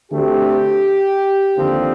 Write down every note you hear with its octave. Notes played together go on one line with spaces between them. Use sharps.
D2 D3 A3 C4 G4
D#2 D3 F3 C4